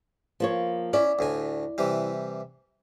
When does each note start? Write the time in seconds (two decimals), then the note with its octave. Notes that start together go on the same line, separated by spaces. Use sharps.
0.40 F3 A#3 C#5
0.93 C#4 E4 D5
1.19 D2 A2 G#5
1.78 C3 E3 G3